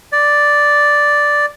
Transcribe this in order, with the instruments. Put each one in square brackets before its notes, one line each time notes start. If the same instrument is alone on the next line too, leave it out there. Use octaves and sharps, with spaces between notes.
[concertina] D5